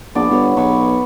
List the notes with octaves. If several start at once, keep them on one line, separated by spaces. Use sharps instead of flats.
A#1 B3 D5
G1 C#5
B1 B4 C#6